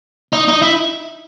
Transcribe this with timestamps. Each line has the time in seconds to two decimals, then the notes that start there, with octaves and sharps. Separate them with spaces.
0.33 D#4
0.48 D#4
0.62 E4